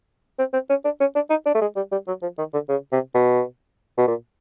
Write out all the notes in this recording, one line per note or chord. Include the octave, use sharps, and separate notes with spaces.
C4
C4
C#4
D4
C#4
D4
D#4
D4
A3
G#3
G3
G3
F#3
F3
D#3
D3
C#3
C3
B2
B2
A#2